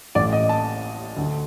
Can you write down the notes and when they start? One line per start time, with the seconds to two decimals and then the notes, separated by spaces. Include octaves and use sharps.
0.15 A1 A2 D5
0.32 D#5
0.49 A5
1.17 D2 D3